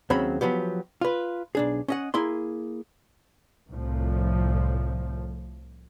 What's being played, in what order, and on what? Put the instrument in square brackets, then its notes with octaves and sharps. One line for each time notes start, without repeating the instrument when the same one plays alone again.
[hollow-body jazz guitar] D#2 C#3 F#3 C4 B5
F3 F#3 B3 G4
F4 B4
B1 D4 G#4
C#4 D#5 F#5
A#3 E4 G#4 C6
[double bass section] C2 A2 F3